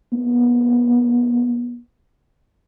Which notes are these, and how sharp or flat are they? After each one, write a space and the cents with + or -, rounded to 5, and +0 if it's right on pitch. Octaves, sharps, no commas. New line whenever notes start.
B3 -35